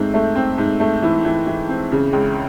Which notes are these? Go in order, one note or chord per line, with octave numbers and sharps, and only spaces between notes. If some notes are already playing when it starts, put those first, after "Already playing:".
Already playing: G#2 A3 C4
A3
C4
G#2
A3
E3
E3
E3
C4
C#3
C#2